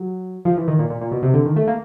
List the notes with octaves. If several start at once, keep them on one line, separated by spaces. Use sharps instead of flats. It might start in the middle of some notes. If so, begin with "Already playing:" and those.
Already playing: F#3
F3
E3
D#3
A#2
A#2
A#2
B2
C3
D3
D#3
A3
A#3